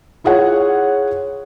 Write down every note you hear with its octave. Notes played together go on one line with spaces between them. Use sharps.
E4 F4 G#4 C#5 F#5